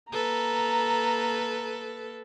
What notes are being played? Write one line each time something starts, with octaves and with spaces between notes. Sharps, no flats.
A#3 A4 B4 A#5